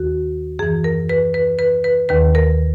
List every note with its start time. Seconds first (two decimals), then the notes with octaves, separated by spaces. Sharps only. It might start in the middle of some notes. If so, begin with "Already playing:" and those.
Already playing: D#2 D#3 F#4
0.59 F#2 E3 G#4
0.84 A#4
1.09 B4
1.34 B4
1.59 B4
1.84 B4
2.09 D#2 D#3 B4
2.35 A#4